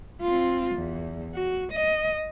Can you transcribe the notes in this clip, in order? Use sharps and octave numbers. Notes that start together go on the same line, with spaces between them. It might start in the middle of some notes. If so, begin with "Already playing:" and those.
C4 F4
E2
F#4
D#5